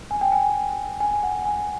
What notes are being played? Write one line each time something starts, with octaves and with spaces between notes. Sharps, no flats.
G#5
G5
G#5
G#5
F#5
G#5